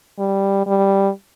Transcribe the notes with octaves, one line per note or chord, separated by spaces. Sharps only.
G3
G3